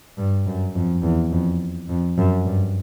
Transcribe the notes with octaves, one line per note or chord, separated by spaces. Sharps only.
G2
F#2
F2
E2
F2
F2
F#2
G2